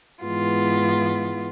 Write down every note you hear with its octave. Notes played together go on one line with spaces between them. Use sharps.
G#2 E3 G#3 B3 F4